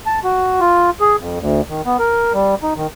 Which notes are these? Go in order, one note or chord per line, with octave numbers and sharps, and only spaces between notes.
A5
F#4
F4
G#4
F2
D2
D#3
B3
A#4
G3
D#4
D#3